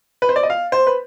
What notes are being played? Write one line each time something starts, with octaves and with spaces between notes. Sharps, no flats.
B4
C5
D5
D#5
F5
C5
B4